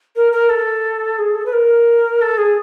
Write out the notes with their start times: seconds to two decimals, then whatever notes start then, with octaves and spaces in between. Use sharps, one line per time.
0.16 A#4
0.32 A#4
0.49 A4
1.18 G#4
1.35 A4
1.45 B4
1.53 A#4
2.21 A4
2.37 G#4